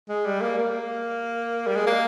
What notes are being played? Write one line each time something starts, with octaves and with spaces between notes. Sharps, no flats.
G#3
G3
A#3
A#3
G3
G#3
A#3